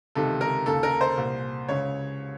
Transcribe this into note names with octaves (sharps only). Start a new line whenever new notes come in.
C#2 C3 D#3 A4
A#4
D#2 C#3 A4
A#4
C5
C2 A#2
C#2 C#3 C#5